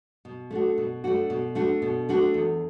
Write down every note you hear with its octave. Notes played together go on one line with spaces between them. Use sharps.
B2
A3 D4 F#4
B2
A3 D4 F#4
B2
A3 D4 F#4
B2
A3 D4 F#4
E2